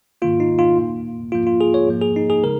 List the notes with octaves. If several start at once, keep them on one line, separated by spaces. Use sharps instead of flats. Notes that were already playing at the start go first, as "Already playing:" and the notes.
G#2 D#3 A#3 F4
D#4
F4
A#2 A#3
G#2 F3 A#3 F4
F4
G#4
C#5
G#2 F3 A#3
G#4
D#4
G#4
C#3 G#3 A#4